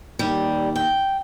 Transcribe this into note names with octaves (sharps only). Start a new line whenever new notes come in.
D#2 G3
G5